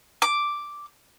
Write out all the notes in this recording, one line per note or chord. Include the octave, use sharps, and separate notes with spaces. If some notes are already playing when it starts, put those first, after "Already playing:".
D6